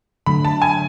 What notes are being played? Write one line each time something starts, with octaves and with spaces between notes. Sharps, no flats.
D3 F#3 A3 B5
A5
G#5